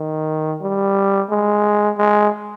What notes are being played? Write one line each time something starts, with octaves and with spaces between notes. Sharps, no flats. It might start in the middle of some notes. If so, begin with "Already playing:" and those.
Already playing: D#3
G3
G#3
G#3